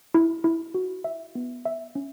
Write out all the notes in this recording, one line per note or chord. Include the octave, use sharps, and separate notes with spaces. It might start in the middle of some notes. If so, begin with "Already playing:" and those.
E4
E4
F#4
E5
B3
E5
C#4